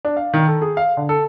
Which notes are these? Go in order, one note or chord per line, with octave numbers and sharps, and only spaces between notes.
D4
F5
D#3
A4
G#4
F5
D3
A4